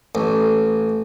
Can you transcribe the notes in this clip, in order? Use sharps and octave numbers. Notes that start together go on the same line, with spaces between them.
A1